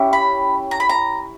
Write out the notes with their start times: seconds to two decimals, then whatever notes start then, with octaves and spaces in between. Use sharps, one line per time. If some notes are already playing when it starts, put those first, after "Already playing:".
Already playing: C#4 E4 G4
0.13 B5
0.71 A#5
0.80 B5
0.89 A#5